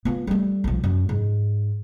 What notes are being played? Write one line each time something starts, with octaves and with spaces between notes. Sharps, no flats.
B3 F4
G3 A3
B1 F3
F#2
G#2